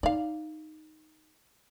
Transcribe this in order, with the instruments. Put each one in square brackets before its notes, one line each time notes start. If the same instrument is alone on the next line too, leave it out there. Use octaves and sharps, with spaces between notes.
[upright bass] D#4 [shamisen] D5 F5